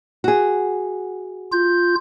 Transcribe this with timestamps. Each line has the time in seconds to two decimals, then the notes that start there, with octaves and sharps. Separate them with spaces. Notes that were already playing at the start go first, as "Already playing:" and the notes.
0.24 F#4 G#4
1.52 F4 G6